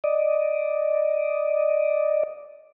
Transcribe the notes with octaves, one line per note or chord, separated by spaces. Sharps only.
D5 D#5